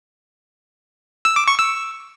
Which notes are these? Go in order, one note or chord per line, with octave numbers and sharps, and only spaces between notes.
E6
D6
C#6
E6